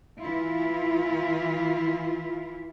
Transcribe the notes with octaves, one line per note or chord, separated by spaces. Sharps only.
E3 E4 F4